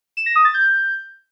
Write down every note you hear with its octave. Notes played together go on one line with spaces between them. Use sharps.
E7
A#6
D#6
A6
G6